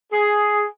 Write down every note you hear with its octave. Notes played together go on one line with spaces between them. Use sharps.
G#4